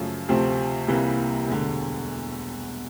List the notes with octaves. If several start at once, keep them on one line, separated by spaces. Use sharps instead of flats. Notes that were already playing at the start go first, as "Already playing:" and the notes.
Already playing: F#2 C#3 F3 A3
D2 C3 F3 A3 C4
C2 C3 E3 G3 A#3
E1 D2 D3